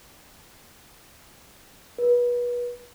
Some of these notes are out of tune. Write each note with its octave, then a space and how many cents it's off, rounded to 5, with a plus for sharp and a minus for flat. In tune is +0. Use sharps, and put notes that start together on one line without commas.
B4 -30